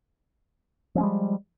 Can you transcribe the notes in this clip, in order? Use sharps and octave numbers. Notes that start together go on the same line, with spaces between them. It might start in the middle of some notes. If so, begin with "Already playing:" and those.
F3 G3 G#3 C#4